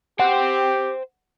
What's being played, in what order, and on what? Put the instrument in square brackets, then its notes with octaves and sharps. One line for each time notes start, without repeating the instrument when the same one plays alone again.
[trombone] G4 [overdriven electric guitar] C5 G5 [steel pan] F#5